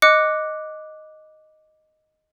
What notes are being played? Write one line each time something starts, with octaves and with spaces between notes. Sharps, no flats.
D#5 D6 F#6 C#7